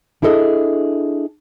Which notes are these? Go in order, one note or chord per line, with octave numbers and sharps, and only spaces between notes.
D4 E4 G#4 A4 D#5